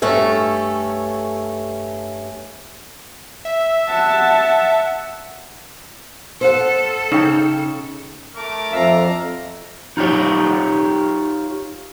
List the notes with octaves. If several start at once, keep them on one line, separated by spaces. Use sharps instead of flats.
G2 A3 C#4 A4
E5
F#5 A5
A4 C5 F5 F#5
C#3 D#4 G5
A3 A#4 D6
F2 D4 E5 F5 A#5
D#4 F4 G4 C#5